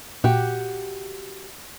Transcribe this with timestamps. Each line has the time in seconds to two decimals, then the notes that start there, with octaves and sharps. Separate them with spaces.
0.24 A#2 F#4 G4